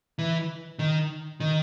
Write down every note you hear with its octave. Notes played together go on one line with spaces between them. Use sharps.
E3
D#3
D#3